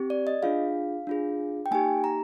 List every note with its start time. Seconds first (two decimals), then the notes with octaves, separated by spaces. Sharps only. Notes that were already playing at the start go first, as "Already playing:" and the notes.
Already playing: C4 G4
0.10 D5
0.27 D#5
0.43 D4 F4 G#4 F5
1.07 D4 F4 G#4
1.66 G5
1.71 A#3 D#4 G4 G#5
2.04 A#5